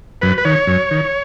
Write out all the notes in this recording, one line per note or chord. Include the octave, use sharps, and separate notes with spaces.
F#2 B4
B4
D#3 C#5
F#2
D#3